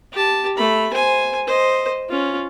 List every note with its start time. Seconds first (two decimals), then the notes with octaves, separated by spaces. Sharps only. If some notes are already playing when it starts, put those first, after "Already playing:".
0.12 G4 A5
0.57 A3 B5
0.93 C5 G#5
1.47 C5 D#5
2.09 C#4 F4